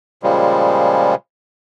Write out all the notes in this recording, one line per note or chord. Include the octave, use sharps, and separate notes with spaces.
A#2 C#3 F3 G3 G#3